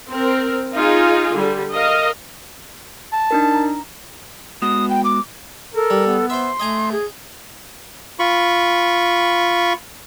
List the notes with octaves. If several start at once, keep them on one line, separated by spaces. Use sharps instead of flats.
C4 A#4
D#4 F4 G#4
D3 G3
A#4 D#5 F5
A5
D4 D#4 A#4
A#5
G#3 B3 F#4 D#6
G5
D6
A4 A#4
G3
B3
C5 E5 C6
A3 D#5 G#5 A#5
G#4
F4 B5 C#6